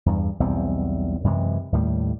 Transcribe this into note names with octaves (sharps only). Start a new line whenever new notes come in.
E2 G2
B1 E2 G3 C4
F#2 C3 E3 G#3
D#2 A2 G3